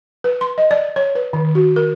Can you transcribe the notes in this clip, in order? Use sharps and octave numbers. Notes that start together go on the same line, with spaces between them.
B4
C6
D#5
D5
C#5
B4
D#3
F#4
A#4